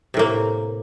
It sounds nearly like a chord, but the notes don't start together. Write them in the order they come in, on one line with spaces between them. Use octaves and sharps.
C3 A2 A#3